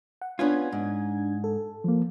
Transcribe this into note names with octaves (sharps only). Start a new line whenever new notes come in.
F#5
B3 C#4 D4 F4 G#6
G#2
A4
F3 A#3